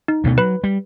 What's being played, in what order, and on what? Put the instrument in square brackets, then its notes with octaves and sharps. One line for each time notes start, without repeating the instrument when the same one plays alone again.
[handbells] D#4
[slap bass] D2 B2 A3
[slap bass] F#3 [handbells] B4 B5
[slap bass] G3